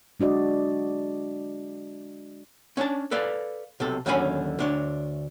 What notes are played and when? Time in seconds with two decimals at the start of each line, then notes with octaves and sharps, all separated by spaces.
0.20 G#3 D4 F#4 D5 D#5
2.77 C#4 D4 G5 A5
3.11 A4 B4 D5 F5
3.80 B1 C3 A4
4.06 D#2 D3 F#3 C#4 G#5 B5
4.59 D2 D4 C#5